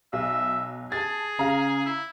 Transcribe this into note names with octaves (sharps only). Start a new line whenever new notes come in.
B1 E5
G#4 A5 A6
C#3 F5 A#5
E4